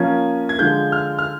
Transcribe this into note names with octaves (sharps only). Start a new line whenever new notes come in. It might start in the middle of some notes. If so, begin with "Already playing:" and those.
Already playing: F3 A#3 C#4 G#6
G#6
D3 F3 G#3 G6
F6
F6